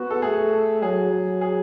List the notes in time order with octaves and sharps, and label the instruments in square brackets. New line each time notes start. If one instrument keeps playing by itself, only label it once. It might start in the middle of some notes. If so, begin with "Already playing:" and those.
Already playing: [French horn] B3 [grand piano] F#4
[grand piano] A4
[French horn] A3 [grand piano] G#4
[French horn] F#3 [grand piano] G#4
[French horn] F#3
[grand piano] G#4